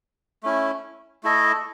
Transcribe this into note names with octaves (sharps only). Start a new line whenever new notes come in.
A3 C#4 E4
A3 E4 A4 D#5